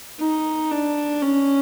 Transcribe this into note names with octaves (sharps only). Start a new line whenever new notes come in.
D#4
D4
C#4